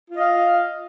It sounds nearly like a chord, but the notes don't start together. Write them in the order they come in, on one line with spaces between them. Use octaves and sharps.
F4 D#5 F5